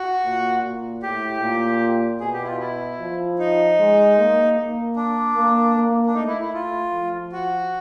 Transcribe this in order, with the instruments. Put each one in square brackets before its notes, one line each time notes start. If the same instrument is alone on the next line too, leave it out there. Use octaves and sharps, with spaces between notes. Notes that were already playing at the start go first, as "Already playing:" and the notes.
Already playing: [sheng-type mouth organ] F#4
[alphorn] A#2
A#2
[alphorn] A2 [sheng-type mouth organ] G4
[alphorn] A#2
[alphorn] B2 [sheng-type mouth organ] G#4
[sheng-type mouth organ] G4
E4
F4
E4
[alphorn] F3
[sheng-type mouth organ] D#4
[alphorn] G#3
A#3
A#3
[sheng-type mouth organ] D4
[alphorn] A#3
A#3
[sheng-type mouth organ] D4
[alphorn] A3 [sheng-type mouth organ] D#4
[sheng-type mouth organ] E4
E4
F4
[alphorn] F3
[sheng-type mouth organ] F#4